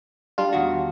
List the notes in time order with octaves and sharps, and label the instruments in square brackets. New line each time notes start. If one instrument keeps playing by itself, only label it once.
[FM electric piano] G3 D4 F4
[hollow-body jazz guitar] E2 D#3 F#4